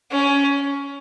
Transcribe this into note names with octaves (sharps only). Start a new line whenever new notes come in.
C#4